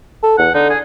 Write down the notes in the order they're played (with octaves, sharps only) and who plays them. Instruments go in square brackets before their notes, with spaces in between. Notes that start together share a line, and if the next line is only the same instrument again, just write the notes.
[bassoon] A4
[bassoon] E2 [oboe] F#5
[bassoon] D3 [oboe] D#4
[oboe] G#4